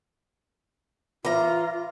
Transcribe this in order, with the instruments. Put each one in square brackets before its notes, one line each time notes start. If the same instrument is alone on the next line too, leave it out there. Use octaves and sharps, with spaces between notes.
[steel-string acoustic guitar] E3 A#5 [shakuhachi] F4